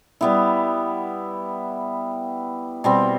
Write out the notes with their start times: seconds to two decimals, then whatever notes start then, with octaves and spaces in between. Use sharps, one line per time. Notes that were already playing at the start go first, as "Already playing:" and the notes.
0.21 G3 B3 E4
2.84 B2 G3 C4